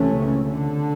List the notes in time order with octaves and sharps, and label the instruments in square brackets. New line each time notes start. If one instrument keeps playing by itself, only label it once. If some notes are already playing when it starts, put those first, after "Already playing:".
Already playing: [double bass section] C#2 C3 E3 A3 C#4
[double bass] C#3
D3